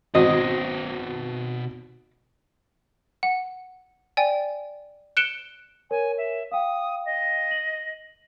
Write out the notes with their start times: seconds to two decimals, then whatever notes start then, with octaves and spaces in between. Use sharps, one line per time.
0.15 G#1 B2 F#4 C5 D#5
3.23 F#5
4.17 D5 G5 G#5
5.17 F#6 C#7 D7 E7 G7
5.91 A#4 C#5 G#5
6.18 E5
6.52 F5 G5 D#6
7.05 D#5
7.51 F#7